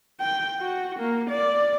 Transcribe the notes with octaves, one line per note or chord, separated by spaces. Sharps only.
G5
F#4
A#3
D5